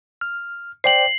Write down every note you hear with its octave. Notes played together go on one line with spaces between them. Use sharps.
F6
C5 D5 G5 C7 F#7